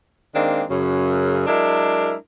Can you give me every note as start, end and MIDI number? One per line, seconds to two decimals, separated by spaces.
0.35 0.63 51
0.35 0.63 56
0.35 0.63 58
0.35 0.63 60
0.35 0.63 62
0.70 1.45 42
0.70 1.45 49
1.47 2.14 54
1.47 2.14 56
1.47 2.14 62
1.47 2.14 64
1.47 2.14 70